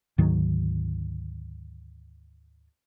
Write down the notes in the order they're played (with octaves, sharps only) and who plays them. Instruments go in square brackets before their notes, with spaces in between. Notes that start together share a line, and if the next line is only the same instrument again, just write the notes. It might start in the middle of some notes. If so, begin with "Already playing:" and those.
[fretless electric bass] D2 G#2 D#3 F#3